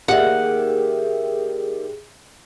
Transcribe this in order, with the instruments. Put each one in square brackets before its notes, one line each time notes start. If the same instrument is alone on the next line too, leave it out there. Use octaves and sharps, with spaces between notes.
[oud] D#3 A#3 [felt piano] G4 D5 E5 [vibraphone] G#4 [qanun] F#5